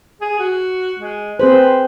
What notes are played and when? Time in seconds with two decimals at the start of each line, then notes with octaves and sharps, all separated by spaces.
0.21 G#4
0.39 F#4
0.99 G#3
1.40 C4 G#4 B4 C5